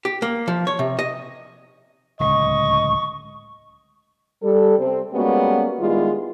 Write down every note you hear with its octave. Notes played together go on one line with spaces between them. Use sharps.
G4
A#3
F3
C#5
C3
D#5
D1 C#2 D#5 C#6
G3 A4
C3 C4
G3 G#3 A#3 B3 C#4 F#4
D#3 G3 G#3 B3 E4 F4